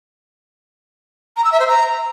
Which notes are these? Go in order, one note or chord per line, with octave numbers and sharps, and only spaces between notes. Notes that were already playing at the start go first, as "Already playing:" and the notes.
A#5
E6
E5
C5
A#5